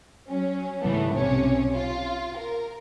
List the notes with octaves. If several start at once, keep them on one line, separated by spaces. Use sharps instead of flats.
F#3 C#4
C#2 G#2 E3 G3 A3 B3
B1 C3 C#4 C#5
F4
A#4